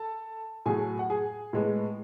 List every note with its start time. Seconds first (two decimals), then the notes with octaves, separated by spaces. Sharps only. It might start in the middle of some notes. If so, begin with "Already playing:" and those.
Already playing: A4 A5
0.66 A2 F#3 A3 G#4 G#5
0.99 F#5
1.10 G#4 G#5
1.53 A2 G#3 B3